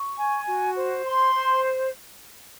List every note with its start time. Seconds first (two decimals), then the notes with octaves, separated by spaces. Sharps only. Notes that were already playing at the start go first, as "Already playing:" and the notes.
Already playing: C#6
0.16 G#5
0.46 F#4
0.76 C5
1.05 C6
1.34 C5